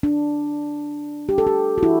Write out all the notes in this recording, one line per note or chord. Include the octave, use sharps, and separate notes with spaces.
D4
G4
A4
G4
F#4
E4